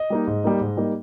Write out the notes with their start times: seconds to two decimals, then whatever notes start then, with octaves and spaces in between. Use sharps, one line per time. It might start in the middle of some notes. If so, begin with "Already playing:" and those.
Already playing: D#5
0.10 G3 A#3 D#4
0.27 G#2
0.44 G3 A#3 D#4
0.61 G#2
0.77 G3 A#3 D#4